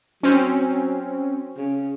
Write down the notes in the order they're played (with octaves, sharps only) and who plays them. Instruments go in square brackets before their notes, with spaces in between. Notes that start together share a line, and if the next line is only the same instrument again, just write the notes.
[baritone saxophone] F#3 [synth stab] C4 C#4
[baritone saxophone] C#3